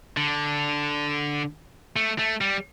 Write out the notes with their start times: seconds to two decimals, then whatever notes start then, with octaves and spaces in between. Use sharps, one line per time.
0.17 D3
1.96 A3
2.18 A3
2.41 G3